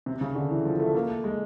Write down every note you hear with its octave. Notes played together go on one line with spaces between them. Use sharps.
C3
C#3
D3
E3
F3
A3
A#3
A3
G#3